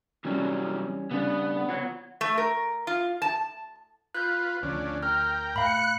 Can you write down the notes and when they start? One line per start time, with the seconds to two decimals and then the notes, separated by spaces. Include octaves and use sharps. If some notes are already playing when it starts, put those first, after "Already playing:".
0.25 C3 E3 F#3 G3 C#4
1.11 C#3 G3 B3 D4
1.69 F4 C#5 F#5
2.21 A3
2.38 A#4
2.87 F4
3.22 A5
4.14 F4 B4 F#6 G6
4.63 D2 C#3 F3 D4
5.03 A#4 G5 F6
5.56 A2 F5 B5 F#6 C#7